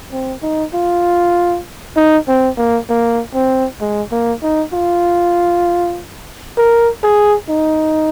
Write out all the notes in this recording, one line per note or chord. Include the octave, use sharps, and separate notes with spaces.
C4
D#4
F4
D#4
C4
A#3
A#3
C4
G#3
A#3
D#4
F4
A#4
G#4
D#4